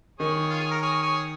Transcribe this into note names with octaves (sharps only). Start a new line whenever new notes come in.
D#3 G#4 C#5
F4
G#4
A#4
G#4 C#5
G#4 C#5